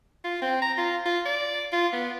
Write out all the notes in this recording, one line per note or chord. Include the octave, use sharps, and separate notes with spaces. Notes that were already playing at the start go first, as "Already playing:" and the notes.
F4
C4
A#5
F4
F4
D5
F4
B3